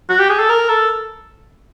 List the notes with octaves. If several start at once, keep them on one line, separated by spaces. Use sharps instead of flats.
F#4
G4
G#4
A4
A#4
A4